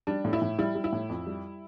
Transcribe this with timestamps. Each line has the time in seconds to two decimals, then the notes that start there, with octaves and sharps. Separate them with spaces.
0.07 G3 D4
0.25 A2
0.33 E4
0.42 A2
0.59 G3 E4
0.75 G3
0.84 E4
0.92 A2
1.09 F2
1.27 G3